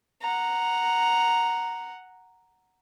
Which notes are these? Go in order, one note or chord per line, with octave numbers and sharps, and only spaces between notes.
F#5 A#5